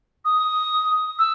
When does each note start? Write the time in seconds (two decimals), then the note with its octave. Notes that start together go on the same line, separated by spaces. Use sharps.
0.25 D#6
1.19 E6